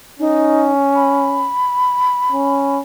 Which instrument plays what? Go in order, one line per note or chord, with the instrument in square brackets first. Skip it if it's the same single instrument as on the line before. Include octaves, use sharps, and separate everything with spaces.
[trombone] C#4 [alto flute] D#4
[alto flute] B5
[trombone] C#4